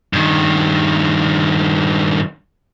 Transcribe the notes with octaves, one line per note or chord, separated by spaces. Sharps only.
G2 D#3